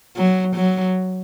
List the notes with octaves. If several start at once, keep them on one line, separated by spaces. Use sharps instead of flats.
F#3
F#3